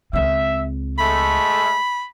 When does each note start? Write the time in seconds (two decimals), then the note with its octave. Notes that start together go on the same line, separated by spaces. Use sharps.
0.13 C#2 C4 E5
0.99 G#3 A3 B5